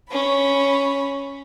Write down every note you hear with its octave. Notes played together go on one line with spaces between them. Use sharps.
C#4 B5